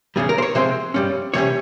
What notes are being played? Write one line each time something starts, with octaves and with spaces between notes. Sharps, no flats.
E2 C#3 G3 G#4
A#4
C5
C#5
C3 F3 G#3 C4 C5
G2 G3 C#4
E2 C3 G3 C#4 C#5